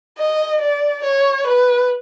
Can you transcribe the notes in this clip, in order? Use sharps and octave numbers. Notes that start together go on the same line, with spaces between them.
D#5
D5
C#5
B4